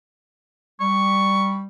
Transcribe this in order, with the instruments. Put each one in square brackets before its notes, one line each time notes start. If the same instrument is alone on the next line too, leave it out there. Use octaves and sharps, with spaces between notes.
[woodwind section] G3 [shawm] C#6